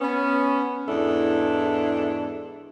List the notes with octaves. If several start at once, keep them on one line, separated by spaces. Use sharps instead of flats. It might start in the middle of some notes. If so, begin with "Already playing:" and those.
B3 C#4
E2 G#2 D4 E4 A4